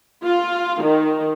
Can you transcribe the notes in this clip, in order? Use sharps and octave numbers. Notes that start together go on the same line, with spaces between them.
F4
D#3